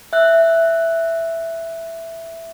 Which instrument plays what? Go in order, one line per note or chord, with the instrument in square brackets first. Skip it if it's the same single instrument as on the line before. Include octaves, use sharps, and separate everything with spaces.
[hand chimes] E5 F#6